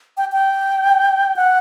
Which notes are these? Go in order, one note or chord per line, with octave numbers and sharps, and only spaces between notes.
G5
G5
F#5